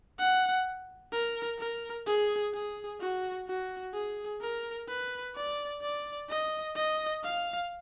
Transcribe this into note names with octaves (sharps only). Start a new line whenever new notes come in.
F#5
A#4
A#4
G#4
G#4
F#4
F#4
G#4
A#4
B4
D5
D5
D#5
D#5
F5